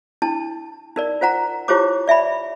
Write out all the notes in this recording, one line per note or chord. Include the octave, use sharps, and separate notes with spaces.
D4 E4 A5
D#4 A#4 D5
F4 C5 F#5 A#5
E4 F4 G4 C5 C#5 D6
D5 E5 G#5 B5